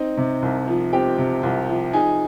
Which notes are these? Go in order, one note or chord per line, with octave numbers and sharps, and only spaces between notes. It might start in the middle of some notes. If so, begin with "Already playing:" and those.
Already playing: C4 D#4 D#5
C3
C2
F3
C4 G4 G5
C3
C2
F3
D#4 G#4 G#5